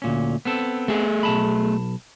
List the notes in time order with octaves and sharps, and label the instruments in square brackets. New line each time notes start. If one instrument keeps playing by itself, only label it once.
[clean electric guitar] D2 A#2 C#4
B3 C4 A4
[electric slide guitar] A3 G#4
[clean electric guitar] B1 A5 B5